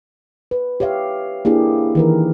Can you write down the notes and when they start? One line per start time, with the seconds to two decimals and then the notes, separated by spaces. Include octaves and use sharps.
0.51 B4
0.80 G4 C#5 E5 F5
1.45 A#3 D4 E4 G4 G#4
1.95 D#3 E3 A#4